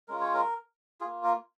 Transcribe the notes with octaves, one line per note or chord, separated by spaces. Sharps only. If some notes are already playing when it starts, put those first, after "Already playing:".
G#3 C#4 F4 A#4
C#5
A#4
A#3 F4 G#4
A#4